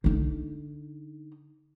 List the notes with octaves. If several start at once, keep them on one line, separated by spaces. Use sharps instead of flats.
D3 D#4